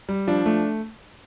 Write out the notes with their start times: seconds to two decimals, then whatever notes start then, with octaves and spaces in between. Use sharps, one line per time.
0.09 G3
0.27 F3 D4
0.46 A3